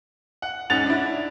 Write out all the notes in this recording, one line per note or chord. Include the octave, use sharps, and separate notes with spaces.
F#5
G#2 C#4 D#5 F#5 A6 F7
D4 E4